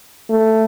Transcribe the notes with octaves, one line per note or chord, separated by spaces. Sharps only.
A3